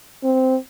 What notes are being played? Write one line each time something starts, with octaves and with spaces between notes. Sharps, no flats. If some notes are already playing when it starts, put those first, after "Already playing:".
C4